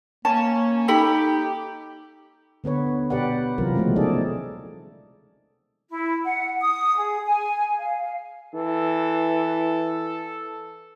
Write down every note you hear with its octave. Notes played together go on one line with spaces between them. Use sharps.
A#3 C#4 A5
D#4 G4 A4 G5 B5
D3 B3 B4 C#5
B2 G4 B4 D5 F#5
C3 E3 F#3 C4 F4 A#4
C#3 F3 G#3 A3 B3
D#4 G#4 A4 D5
E4
F#5
D#6
G#4
G#5
F5
E3 A4